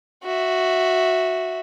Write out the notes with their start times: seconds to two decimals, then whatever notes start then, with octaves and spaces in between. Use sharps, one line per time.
0.24 F#4 E5